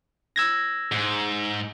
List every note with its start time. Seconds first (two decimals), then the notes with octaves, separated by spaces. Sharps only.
0.36 E6 G#6 A#6
0.92 G#2